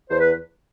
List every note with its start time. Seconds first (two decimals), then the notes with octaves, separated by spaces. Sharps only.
0.10 E2 C5
0.20 B4